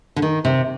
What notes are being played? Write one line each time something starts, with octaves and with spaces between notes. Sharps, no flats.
D3
D#3
C3